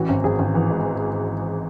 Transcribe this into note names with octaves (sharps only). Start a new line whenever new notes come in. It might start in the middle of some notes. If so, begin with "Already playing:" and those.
Already playing: A1 E3 F#4
G#1
G#1 G#4
G#1
E3
G#2